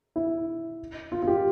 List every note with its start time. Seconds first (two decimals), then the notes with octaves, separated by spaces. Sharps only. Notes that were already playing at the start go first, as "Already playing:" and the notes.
0.16 E4
1.12 F4
1.22 F4
1.27 G4